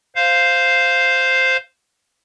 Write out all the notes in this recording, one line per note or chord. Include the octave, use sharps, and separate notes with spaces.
C5 F5